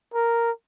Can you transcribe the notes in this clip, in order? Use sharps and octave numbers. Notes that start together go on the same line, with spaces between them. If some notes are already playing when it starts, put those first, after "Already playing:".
A#4